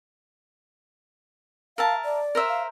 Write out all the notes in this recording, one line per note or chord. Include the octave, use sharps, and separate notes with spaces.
A#4 E5 F5 A5
D5
A#4 C5 E5
F5